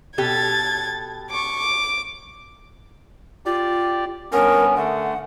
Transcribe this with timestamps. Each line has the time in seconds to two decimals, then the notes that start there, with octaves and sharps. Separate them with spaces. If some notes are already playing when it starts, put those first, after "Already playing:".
0.18 B2 G4 A4 G#6 A6
1.30 C#6 D6
1.59 D6
3.46 F4 G4 D5
4.32 G2 B3 C#4 A#4
4.76 D3 A3 F#5